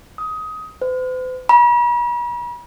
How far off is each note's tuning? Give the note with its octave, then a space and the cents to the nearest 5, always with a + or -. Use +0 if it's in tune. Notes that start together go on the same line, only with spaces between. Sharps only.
D#6 +20
C5 -45
B5 -45